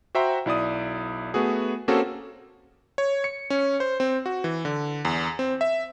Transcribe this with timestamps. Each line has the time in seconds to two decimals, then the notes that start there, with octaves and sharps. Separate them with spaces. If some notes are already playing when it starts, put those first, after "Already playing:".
0.15 F#4 C5 E5 G5 A#5 C6
0.46 B1 E4 D5 D#6
1.34 A3 B3 F#4 G#4
1.88 A#3 C4 C#4 F#4 G#4 A4
2.98 C#5
3.24 C#7
3.50 C#4
3.80 C5
4.00 C4
4.26 F#4
4.44 E3
4.65 D3
5.05 E2
5.39 C4
5.61 E5